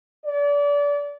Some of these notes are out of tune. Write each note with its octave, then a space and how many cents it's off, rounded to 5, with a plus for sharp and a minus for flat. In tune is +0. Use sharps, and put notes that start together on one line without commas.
D5 -30